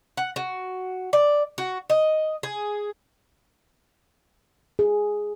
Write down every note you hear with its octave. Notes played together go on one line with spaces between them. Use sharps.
F#5
F#4
D5
F#4
D#5
G#4
G#4